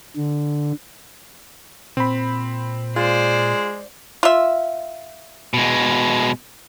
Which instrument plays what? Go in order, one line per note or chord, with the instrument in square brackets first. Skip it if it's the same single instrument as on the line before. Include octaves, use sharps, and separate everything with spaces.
[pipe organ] D3
[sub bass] A#2 [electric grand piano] C4 B5
[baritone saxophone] G#3 [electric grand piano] F4 [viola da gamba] C5 D5
[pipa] F4 E5
[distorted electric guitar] B2 G#3